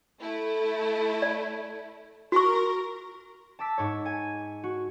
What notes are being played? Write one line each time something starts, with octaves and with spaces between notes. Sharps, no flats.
A3 E4
D5
F#4 A#4 C#6
A5 D6 E6 B6
G#2 C#5
G#5
F#4